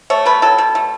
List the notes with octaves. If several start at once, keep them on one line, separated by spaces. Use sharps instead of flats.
A3 C#5
B2 B4
F#3 A4
B2
A3